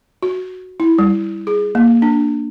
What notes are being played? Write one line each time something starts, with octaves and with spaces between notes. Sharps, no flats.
F#4
E4
G3
G#4
A#3
D4